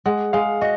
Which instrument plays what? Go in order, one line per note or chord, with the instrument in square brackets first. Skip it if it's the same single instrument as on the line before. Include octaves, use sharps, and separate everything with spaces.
[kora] G#3 [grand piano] F#5
[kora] G#3 [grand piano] F5
[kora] F#4 [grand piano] D#5